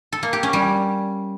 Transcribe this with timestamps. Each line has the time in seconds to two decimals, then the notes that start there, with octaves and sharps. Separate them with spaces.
0.12 A4
0.23 A#3
0.33 G4
0.43 C#4
0.53 G3